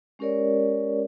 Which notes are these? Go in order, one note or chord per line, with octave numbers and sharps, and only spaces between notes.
G#3 C#4 G4 A#4 C#5 D5